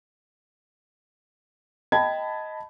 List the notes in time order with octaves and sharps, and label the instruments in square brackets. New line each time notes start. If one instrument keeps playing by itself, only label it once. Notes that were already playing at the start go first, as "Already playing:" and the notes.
[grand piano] D#5 G5 A5 B5 G#6